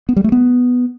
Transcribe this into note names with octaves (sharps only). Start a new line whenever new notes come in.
B3
G3
A3
B3